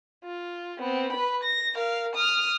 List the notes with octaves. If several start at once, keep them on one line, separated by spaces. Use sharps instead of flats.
F4
B3 C4
B4 B5
A#6
A#4 F5
D#6 F6